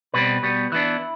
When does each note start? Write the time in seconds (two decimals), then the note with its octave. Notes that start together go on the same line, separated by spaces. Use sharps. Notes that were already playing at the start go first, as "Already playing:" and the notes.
0.14 B2 G3 C4 B4
0.43 B2 G3 B3
0.72 E3 B3 D4 E4